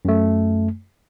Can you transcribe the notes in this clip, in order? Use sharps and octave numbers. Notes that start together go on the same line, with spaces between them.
F#2 A3